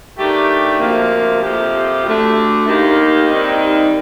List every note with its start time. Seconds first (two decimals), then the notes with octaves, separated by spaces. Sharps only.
0.16 D#3 A3 D4 G4
0.78 D2 C3 F3 A#3
1.41 F2 C3 F3 C4 G4
2.03 D2 D3 A3 D4
2.67 D#2 D#3 A#3 D#4 G4
3.29 D#2 D#3 G3 C4 D#4